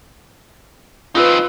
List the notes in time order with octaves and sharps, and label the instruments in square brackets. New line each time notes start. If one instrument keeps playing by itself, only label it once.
[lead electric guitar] C4 D#4 [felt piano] F4 B4